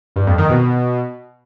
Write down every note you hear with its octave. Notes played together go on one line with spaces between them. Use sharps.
G2
F2
D#3
B2